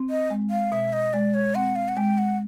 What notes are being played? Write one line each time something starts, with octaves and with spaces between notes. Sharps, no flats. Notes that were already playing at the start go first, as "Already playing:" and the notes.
Already playing: C4
D#5
G#3
F5
B2 E5
D#5
G#3 D5
C#5
C4 F#5
F5
F#5
G#3 G5
F#5